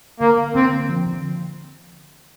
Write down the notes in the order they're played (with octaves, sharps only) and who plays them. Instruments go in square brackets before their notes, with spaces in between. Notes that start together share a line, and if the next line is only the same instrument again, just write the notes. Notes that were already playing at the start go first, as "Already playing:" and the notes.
[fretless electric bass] D3 [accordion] A#3
[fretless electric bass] A#3
[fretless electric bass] D3 [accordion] C4
[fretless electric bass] A#3
F3
D3